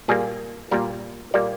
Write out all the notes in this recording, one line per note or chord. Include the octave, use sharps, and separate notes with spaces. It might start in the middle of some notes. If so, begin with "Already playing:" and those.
A#2 G3 A#3 G#4
A#2 G3 A#3 A#4
A#2 G3 A#3 D5